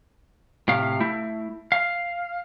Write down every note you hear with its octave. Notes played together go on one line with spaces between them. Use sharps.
A2 C3 F5
A3 E4
F5